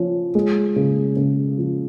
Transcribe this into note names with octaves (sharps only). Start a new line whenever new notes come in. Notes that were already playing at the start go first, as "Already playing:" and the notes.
Already playing: F3 C#4
G#3
C#3
C#3
F3